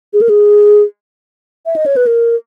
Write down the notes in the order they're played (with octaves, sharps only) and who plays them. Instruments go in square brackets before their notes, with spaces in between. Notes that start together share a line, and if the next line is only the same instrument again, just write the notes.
[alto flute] G#4
A#4
G#4
E5
D#5
C#5
B4
A#4